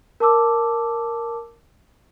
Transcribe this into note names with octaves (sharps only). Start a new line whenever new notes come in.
A#4 A5 D6 E6